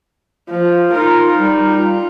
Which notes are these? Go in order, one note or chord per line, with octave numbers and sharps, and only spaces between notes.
F3
D#4 F4 A#4
G3
F4